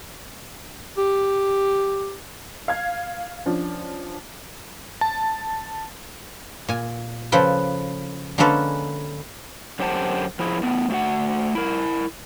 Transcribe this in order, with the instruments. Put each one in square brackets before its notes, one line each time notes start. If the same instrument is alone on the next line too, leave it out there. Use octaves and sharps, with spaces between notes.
[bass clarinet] G4
[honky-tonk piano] F5 G#6
F3 C#4 D4
[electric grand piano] A5
[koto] A#2 G#5
C#3 F3 A4 B4 G5
D3 G#3 A#3 C#4 A4 B4
[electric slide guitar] F#2 D3 G4 C5 F#5 A5
F3 E4 G#4
A2 B3
A3 F#4 F#5
E4 A#4